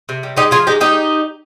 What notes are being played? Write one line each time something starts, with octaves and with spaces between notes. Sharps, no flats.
C3
G3
G#3 D#4 G4
F3 F4 G#4
G#3 D#4 G4
G#3 D#4 G4